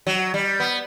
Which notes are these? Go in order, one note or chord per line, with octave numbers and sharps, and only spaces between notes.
F#3
G3
B3